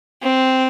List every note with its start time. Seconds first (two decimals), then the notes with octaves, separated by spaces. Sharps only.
0.22 C4